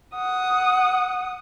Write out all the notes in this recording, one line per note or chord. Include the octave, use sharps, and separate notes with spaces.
F#5 D#6